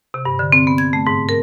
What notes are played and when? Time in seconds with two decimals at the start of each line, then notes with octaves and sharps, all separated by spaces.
0.14 C3
0.25 G2
0.39 D3
0.52 C4
0.67 B3
0.78 G#6
0.93 A3
1.07 G#2
1.29 A#4